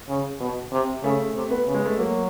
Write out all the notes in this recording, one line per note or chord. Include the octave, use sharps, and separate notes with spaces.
C#3
B2
C3
C#3 A3
C3
B3
C#3
G#3
A3
F#3 A#3